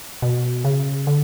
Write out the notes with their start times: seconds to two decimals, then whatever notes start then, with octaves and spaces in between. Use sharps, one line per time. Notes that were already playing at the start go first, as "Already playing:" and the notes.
0.22 B2
0.65 C#3
1.07 D3